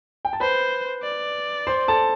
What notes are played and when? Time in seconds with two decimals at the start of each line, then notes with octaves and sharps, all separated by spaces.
0.25 G5
0.33 A5
0.40 B4 C5 B5
1.03 D5
1.67 C5 C6
1.88 A4 A5